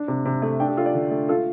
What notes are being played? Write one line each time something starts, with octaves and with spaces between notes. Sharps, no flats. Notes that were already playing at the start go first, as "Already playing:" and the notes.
Already playing: D4
C3
C3
A3
D4 G5
G4
F4 A4
D5
D3
A3
F4 A4